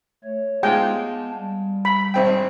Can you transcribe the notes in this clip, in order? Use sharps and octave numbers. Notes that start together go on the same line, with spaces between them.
A3 C#5
G#3 B3 F4 G5 A5
G3
B5
G#1 C4 G5